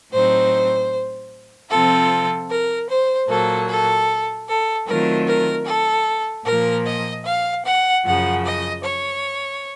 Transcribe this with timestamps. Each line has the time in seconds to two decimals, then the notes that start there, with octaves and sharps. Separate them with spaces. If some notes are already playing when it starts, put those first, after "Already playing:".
0.12 A2 F#3 C4 D#4 C5
1.70 C3 F3 C4 F4 A4
2.50 A#4
2.89 C5
3.29 A#2 F#3 A#3 A4
3.68 A4
4.48 A4
4.87 D#3 F#3 A3 C4 F4 A#4
5.27 A#4
5.66 A4
6.45 A#2 F3 A#3 A#4
6.85 D#5
7.25 F5
7.64 F#5
8.05 F#2 C#3 F3 F#5
8.44 D#5
8.84 C#5